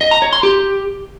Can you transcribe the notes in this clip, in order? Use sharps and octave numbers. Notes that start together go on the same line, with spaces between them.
D#5
A#5
C#5
C6
G4